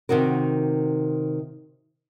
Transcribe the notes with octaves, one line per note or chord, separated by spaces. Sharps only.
C3 D#3 D#4 F#4 A#4